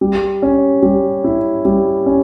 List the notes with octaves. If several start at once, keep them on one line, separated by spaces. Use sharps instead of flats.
G3
C#4
G3
E4
G3
C#4